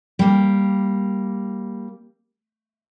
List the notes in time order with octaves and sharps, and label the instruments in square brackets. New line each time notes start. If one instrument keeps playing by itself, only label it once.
[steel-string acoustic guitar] G3 A#3